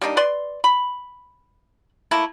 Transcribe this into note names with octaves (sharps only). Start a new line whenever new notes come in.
G3 A#3 D4 D#4
B4 D5 C6
B5
A3 A#3 E4 A5